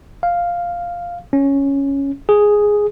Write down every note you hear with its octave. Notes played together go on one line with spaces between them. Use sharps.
F5
C#4
G#4